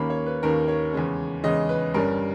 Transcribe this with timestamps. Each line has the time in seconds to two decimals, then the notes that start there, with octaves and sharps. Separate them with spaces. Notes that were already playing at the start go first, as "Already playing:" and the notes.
Already playing: D#2 D#3 A#3 C#4 B5
0.10 C#5
0.26 B4
0.43 D#2 D#3 A#3 C#4 A#4
0.68 C#5
0.93 E2 C#3 G#3 C#4
1.43 E2 C#3 G#3 C#4 D#5
1.69 B4
1.94 G1 G2 G3 C#4 A#4